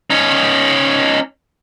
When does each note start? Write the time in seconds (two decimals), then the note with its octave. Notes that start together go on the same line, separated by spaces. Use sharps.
0.10 C#4 D#4